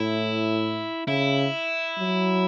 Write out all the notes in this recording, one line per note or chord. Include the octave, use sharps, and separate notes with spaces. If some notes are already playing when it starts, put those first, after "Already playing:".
Already playing: A2 E4
C#3 E4
F#3